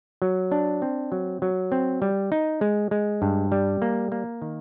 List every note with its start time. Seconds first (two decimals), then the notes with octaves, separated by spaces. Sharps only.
0.22 F#3
0.52 D4
0.82 C4
1.12 F#3
1.42 F#3
1.72 C4
2.02 G3
2.32 D#4
2.61 G#3
2.91 G#3
3.22 G2
3.52 G3
3.82 A#3
4.12 A#3
4.42 D#3